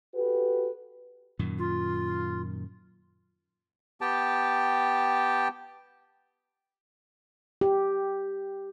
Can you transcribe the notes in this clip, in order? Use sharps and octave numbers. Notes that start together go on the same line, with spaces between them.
F#4 G4 A4 B4
F#2 A#2 D#3
F4
B3 G4 G5 A5
G4